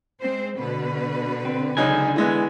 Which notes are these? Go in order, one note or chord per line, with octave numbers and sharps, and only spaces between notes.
G#3 C4 C5
B2 D3 B4
C4
C#2 D3 F#3 D#4 G#5
E3 G#3 B3